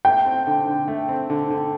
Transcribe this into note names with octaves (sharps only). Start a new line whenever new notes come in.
A3 G5
C4
D3
D3
A3
C4
D3
D3